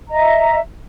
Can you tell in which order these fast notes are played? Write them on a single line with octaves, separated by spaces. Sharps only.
A#5 D#5 E5